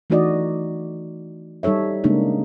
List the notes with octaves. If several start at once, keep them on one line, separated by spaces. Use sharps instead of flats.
E3 A3 D#4 F#4 D5 D#5
G3 D#4 A4 C#5 E5
C#3 G#3 A#3 D4 D#4